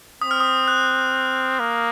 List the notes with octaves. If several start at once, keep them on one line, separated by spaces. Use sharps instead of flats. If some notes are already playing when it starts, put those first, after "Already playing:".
C4 D#6
F6
D#6
F#6
A#3